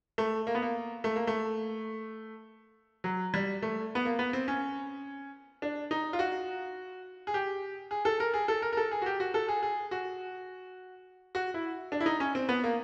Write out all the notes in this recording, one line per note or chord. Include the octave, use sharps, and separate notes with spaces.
A3
A#3
B3
A#3
A3
A#3
A3
F#3
G3
A3
B3
A#3
B3
C4
C#4
D4
D#4
F4
F#4
G#4
G4
G#4
A4
A#4
G#4
A4
A#4
A#4
A4
G#4
F#4
G4
F#4
A4
G#4
G#4
F#4
F#4
E4
D4
E4
D#4
C#4
C4
B3
A#3